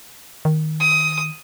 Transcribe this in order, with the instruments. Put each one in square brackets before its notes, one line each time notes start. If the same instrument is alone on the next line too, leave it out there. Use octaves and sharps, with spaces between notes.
[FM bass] D#3
[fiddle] D#6